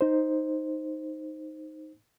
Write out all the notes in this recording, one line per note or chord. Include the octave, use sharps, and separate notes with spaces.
D#4 C5